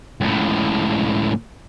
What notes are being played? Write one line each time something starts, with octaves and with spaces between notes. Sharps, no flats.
C#2 A2